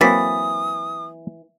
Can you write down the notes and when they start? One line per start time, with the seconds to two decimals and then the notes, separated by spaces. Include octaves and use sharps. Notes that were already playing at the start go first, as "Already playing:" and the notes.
0.01 E3 F#3 A#3 C4 D#6 A6 B6